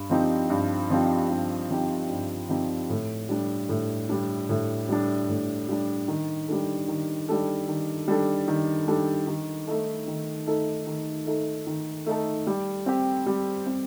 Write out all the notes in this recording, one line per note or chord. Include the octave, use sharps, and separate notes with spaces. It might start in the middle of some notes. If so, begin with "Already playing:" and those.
Already playing: G2
F3 C4 D#4 G4
G2
F3 C4 D#4 G4
G2
F3 C4 D#4 G4
G2
F3 C4 D#4 G4
A2
G3 D4
A2
G3 D4
A2
G3 D4
A2
G3 D4
D#3
G3 D4 A4
D#3
G3 D4 A4
D#3
G3 D4 A4
D#3
G3 D4 A4
D#3
A3 D#4 A4
D#3
A3 D#4 A4
D#3
A3 D#4 A4
D#3
A3 D#4 A4
G3
C4 G4
G3
C4 G4